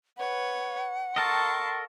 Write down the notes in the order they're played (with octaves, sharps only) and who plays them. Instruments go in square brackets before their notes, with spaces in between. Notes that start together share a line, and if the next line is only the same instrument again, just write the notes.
[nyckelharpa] B4 C#5 [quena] F#5
[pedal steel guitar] A4 A#4 D#5 [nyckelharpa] A5 [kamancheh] C6 C#6